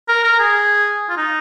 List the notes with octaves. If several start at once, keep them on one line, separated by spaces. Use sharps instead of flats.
A#4
A#4
G#4
F4
D#4